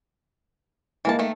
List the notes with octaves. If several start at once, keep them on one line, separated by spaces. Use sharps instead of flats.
E3 G#3 A#3 D#4 A5
D#3 A3